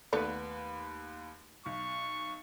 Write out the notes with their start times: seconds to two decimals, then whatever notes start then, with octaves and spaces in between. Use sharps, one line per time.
0.13 D#2 A3 B3 B4 D5
1.66 B1 C#6